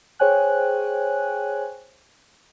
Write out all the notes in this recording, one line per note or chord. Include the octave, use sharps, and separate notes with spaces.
G#4 C5 C#5 G5 G#5 F#6